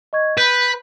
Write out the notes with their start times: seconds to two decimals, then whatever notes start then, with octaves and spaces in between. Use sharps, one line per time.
0.13 D#5 C#6 G#6
0.38 B4 G6